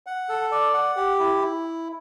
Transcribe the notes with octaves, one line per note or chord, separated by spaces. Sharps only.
F#5
A4
D5
F#5
G4
E4
E4